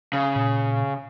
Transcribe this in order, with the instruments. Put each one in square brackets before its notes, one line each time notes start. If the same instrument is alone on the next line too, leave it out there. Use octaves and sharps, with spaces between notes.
[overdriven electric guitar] C#3
[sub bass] A#2